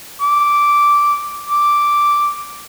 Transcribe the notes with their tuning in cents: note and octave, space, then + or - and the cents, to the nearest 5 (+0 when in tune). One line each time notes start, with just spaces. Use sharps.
D6 -10
D6 -5